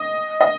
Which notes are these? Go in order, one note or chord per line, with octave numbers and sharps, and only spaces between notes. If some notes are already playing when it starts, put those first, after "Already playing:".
Already playing: D#5
D#5